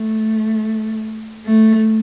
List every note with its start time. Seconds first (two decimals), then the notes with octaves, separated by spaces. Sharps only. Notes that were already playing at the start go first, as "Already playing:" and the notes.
Already playing: A3
1.46 A3